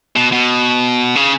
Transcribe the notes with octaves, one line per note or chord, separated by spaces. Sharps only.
B2
B2
C#3